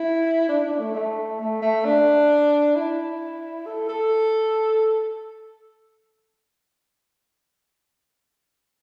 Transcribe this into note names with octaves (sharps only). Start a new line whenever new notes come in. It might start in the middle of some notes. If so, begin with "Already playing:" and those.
Already playing: E4
D4
D4
A3
A3
A3
A3
D4
E4
A4
A4